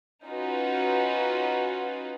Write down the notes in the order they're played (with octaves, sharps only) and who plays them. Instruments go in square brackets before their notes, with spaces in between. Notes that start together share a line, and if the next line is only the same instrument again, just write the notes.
[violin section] C#4 D#4 F4 F#4 B4